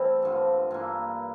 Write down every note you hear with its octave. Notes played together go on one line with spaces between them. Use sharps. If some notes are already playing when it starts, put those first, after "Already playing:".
Already playing: E3 G3 A3 C4 E4
G2 D3 F3 C4
G2 E3 A#3 E4